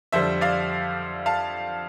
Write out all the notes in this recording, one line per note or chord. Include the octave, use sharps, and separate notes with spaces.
F2 D3 G3 C5 E5
D5 F5
F5 A5